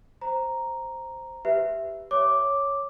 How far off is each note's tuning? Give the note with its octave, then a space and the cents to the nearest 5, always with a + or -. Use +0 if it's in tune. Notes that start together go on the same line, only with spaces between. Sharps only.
C5 +0 A#5 +0
G4 +0 B4 +0 E5 +0
C#5 +0 D6 +0